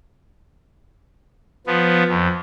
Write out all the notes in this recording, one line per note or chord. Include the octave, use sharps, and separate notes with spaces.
F3 B3
F2